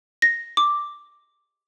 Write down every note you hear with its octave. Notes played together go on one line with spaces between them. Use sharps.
A#6
D6